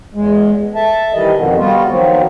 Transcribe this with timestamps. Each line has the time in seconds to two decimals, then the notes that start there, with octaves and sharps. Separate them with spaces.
0.15 E2 G#3
0.75 A4 E5 A5
1.13 D#3 E3 G3 D#5
1.36 F2 B2 D3 D#3
1.58 G3 B3 F4 F#4
1.89 D#3 F3 F#3 B3 C4